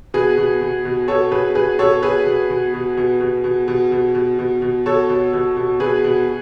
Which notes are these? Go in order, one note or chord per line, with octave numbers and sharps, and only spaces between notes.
B2 G#4 B4
B2
B2
B2
B2 A4 C#5
B2 G#4 B4
B2 G#4 B4
B2 A4 C#5
B2 G#4 B4
B2
B2
B2
B2
B2
B2
B2
B2
B2
B2
B2
B2 A4 C#5
B2
B2
B2
B2 G#4 B4
B2